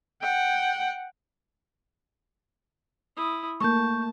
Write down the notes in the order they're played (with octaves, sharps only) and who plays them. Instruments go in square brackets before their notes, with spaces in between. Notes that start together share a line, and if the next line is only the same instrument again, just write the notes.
[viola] F#5 G5
[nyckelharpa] E4 D#6
[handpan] A3 A#3 [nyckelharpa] A5 [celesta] C#6 G6